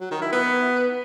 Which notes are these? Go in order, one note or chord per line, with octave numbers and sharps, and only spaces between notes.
F#3
D#3
E4
B3